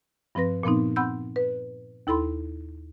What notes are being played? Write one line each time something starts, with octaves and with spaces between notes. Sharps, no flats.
G2 F3 C4 B4 A#6
A#2 F3 B3 C4 D#4
C4 F#5 B5 E6 G6
B4
D#2 E4 A4 B5 C6